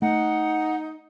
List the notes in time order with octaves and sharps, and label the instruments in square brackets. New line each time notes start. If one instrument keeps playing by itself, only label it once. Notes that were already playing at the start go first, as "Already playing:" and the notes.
[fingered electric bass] A3 [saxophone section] D#4 [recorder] F#5